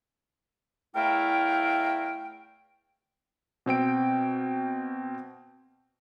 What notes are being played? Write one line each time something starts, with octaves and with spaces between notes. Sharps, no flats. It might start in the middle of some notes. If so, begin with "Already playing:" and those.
E2 A3 E4 A#4 F5 G5
B2 C4 G5 D7